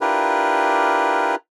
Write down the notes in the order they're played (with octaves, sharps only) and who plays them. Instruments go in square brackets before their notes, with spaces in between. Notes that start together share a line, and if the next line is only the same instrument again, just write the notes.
[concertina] D4 E4 F4 G4 A#4 B4